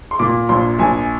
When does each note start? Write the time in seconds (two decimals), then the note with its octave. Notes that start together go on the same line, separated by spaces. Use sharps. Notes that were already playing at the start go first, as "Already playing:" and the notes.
0.11 C6
0.19 A#2 D6
0.49 A#1 C6
0.79 A#1 G#5